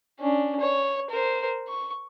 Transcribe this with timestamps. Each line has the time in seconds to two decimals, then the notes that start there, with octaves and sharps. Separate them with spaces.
0.20 C#4 D4
0.60 C#5
1.10 A#4 C5
1.68 C#6